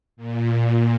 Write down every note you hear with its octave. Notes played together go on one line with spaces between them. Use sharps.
A#2